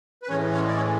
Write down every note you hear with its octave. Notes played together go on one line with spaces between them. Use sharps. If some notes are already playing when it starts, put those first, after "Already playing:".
B4
A2 E3 G#3 C#4 C#5
C#4 C#5
D5
C#4 C#5